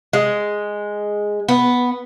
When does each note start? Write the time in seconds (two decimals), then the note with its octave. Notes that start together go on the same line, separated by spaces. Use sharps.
0.13 G#3
1.49 B3